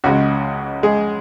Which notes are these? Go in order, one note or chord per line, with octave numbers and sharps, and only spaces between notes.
C#2 C#3 G#3 F#4
G#3 G#4